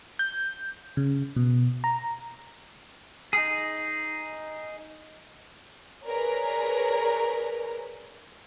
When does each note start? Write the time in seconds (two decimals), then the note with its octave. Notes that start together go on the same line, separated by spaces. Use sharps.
0.19 G6
0.97 C#3
1.36 B2
1.84 A#5
3.33 D#4 G#4
6.06 G#4 A#4 B4 C#5 D5 A#5